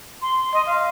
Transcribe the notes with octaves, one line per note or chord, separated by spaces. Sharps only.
C6
D#5 C6
F5